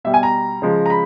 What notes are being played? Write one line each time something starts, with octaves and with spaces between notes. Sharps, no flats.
B2 G3 E5
G#5
A#5
C#3 F3 G#3
A#5
B5